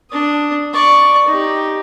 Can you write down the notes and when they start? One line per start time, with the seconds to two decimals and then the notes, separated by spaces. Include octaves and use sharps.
0.11 D4 D#6
0.74 D5 C#6
1.28 D#4 G4